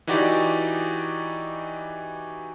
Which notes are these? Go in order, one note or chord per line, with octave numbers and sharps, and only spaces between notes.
E3 D#4 F#4 G4 D5